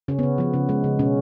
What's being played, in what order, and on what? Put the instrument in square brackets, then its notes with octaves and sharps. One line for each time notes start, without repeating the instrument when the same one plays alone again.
[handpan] C#3 C#4
C#3 B3
F3 B3
C#3
G#3
C#3
B2 C#4